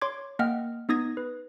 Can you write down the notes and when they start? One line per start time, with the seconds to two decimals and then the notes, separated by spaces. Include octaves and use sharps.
0.02 C#5 C6 D6 G#6
0.39 A#3 D#5 F#5 G5 F6
0.89 B3 D#4 D#6 G#6 A#6
1.17 B4